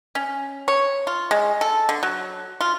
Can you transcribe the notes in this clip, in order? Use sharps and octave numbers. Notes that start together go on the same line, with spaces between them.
C#4
C#5
F4
G#3
A4
D3
F#3
F4